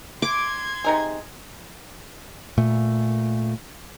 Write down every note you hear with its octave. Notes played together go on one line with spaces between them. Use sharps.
C6 D6 G#6
C3 D#4 G#4
A#2 A3